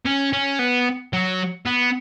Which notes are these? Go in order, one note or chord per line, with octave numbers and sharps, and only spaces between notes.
C#4
C#4
B3
F#3
B3